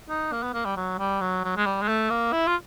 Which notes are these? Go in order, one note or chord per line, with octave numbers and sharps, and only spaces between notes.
D#4
A#3
B3
A#3
G3
F#3
G3
F#3
F#3
G#3
G3
G#3
A3
A#3
E4
F4